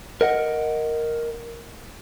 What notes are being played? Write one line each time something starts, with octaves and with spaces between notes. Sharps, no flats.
A#4 D#5 F#5